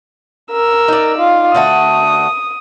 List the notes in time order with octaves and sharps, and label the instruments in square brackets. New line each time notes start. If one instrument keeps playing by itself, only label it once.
[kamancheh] A#4 E6
[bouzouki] D#4 D5
[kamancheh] F4
[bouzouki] D3 A3 F#4 [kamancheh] D#6